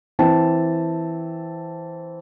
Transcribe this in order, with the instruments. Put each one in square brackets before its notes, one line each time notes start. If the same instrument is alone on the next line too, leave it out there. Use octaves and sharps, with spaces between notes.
[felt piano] E3 C4 A5